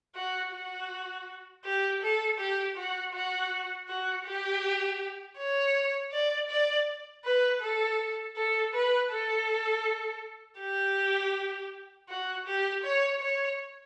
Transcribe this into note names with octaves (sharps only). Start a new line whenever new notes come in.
F#4
F#4
G4
A4
G4
F#4
F#4
F#4
G4
C#5
D5
D5
B4
A4
A4
B4
A4
G4
F#4
G4
C#5
C#5